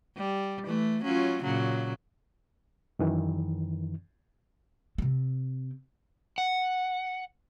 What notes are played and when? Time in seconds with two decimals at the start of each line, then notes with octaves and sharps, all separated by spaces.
0.17 G3
0.65 E3 A3
1.03 F#3 C#4 F4
1.43 A#2 C#3 F#3
2.99 F#2 D#3 E3
4.98 C3 C4
6.38 F#5